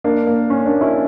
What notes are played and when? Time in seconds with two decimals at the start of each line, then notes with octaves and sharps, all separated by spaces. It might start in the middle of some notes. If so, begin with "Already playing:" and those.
0.04 A#3 D4
0.27 A#3
0.50 C#4
0.66 A#3 D4
0.81 C#4 E4